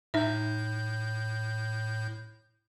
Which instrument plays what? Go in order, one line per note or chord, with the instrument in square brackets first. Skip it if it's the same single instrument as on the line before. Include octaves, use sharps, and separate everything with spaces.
[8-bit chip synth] A2 G6 [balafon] D#4 E5